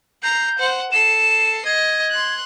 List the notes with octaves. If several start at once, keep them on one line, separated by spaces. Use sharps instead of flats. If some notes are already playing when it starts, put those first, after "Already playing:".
A#5 G6 C7
C5 F#5
A4 C7 E7
D#5 G#6
C6 F#6